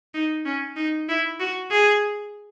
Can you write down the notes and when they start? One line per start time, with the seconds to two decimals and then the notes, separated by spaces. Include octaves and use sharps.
0.14 D#4
0.45 C#4
0.76 D#4
1.09 E4
1.40 F#4
1.71 G#4